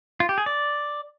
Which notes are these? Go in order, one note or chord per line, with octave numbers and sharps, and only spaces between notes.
F4
G4
G#4
D5